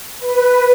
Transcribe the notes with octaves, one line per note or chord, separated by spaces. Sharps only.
B4